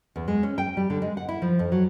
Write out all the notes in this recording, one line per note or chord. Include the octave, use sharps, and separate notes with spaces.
E2
G#3
C#4
G5
G3
D3
G#3
F#5
E4
F3
F2
F#3